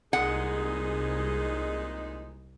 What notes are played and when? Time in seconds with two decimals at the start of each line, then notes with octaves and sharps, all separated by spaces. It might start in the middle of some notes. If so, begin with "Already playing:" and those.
0.13 C2 A#2 G#3 D#4 G#4 F#5